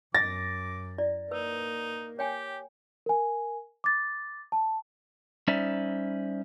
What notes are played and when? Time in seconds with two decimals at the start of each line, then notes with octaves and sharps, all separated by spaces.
0.15 F#2 D6 A6 A#6
0.98 E4 D5
1.31 A#3 D#4 B4 E6
2.19 G4 C#5 G5 G#5
3.06 A#4 G#5
3.84 D6 A6
4.52 A5
5.48 G3 C#4 D#4 C5 D5 E5